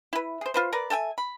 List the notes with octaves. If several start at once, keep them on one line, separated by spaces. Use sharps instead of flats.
E4 B4
G#4 C5
F4 B4 C5
A#4 B4 D5
A4 E5 G5 G#5
B5